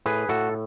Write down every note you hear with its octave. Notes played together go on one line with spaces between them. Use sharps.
A2 G#4 B4
A2 F#4 A4